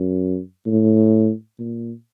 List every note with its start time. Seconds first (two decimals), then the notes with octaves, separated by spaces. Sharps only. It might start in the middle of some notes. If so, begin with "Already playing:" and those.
Already playing: F#2
0.66 A2
1.59 A#2